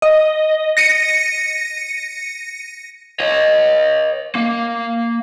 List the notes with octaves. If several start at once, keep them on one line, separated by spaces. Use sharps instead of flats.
D#5
A#6 C#7 D#7
C#5 D#5
A#3